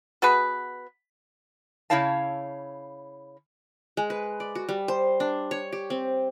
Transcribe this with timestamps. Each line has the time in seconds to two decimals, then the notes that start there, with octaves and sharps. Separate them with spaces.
0.22 B3 F#4 G#4 B4
1.90 C#3 C4 E4 C#5 F5 A5
3.97 G#3
4.10 B4
4.40 D5
4.55 F#4
4.69 G3
4.88 C5
5.20 D4
5.51 C#5
5.72 G4
5.90 C4